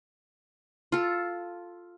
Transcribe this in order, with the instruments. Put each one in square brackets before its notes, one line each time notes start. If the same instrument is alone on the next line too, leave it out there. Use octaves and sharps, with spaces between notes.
[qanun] F4 A4